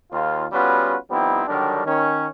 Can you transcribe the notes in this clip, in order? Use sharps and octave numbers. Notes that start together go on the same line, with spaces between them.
D#2 F4
G3 B3 C#4 F4 F#4 B4
F3 G3 B3 C4 D#4 E4
D3 D#3 F#3 G3 D4 A#4
D#3 C#4